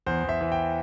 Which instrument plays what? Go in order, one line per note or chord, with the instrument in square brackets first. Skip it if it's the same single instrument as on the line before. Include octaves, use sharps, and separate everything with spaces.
[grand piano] E2 C5
E2
E5
E3
G5